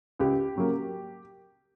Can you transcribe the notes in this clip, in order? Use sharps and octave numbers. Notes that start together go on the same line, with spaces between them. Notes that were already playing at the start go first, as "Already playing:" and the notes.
C#2 G4
C#3 F#3 A#3